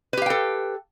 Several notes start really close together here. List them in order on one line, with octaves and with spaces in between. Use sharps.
B4 G4 F5 G5 A4